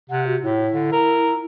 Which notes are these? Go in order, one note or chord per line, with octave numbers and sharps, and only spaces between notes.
C3 F#5
F#4
A2 E4
D3
A#4